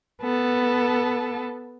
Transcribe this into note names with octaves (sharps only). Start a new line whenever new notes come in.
B3 A4